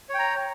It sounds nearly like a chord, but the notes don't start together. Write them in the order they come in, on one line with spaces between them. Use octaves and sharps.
C#5 G5 A#5